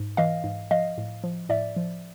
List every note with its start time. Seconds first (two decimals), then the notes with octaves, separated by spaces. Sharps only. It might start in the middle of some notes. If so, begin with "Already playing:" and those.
Already playing: G#2
0.17 E3 D#5 F5
0.44 G#2
0.71 F3 D#5 F5
0.98 A2
1.24 F3
1.49 A2 D5 E5
1.76 F3